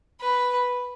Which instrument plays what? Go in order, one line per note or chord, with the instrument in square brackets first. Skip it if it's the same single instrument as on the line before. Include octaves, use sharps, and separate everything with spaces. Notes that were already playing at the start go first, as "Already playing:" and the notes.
[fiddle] B4